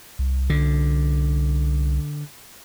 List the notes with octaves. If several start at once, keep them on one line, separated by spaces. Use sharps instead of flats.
C2
D3